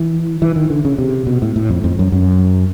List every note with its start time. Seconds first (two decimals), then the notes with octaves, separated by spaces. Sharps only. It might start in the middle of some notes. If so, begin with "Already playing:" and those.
Already playing: E3
0.42 E3
0.56 D#3
0.70 D3
0.85 C#3
0.98 C3
1.27 B2
1.42 A2
1.56 A2
1.70 F2
1.84 F2
1.99 F#2
2.12 F#2